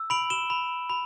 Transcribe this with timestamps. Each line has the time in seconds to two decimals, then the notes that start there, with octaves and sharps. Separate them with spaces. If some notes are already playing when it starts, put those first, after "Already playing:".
Already playing: E6
0.10 B5 D7 F#7
0.30 E7 G7
0.50 B5
0.90 B5